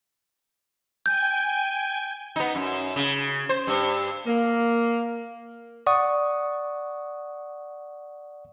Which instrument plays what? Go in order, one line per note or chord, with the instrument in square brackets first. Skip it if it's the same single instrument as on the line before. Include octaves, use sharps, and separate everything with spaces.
[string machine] G5 G#5 [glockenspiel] G6
[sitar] B3 D#4
F#2
C#3
C5
G2
[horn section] A#3
[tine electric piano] D5 F#5 C#6 D#6